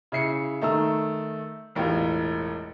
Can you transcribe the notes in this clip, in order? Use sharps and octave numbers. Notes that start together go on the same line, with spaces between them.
C#3 E4 C7 C#7
D#3 A3 A#5 E6
E1 A1 F4 G4